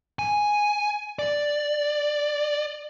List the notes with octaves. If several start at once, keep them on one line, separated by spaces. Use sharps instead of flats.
G#5
D5